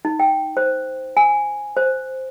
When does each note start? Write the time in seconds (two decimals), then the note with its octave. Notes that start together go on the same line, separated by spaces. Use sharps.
0.05 D#4
0.20 G5
0.57 C5
1.17 G#5
1.77 C5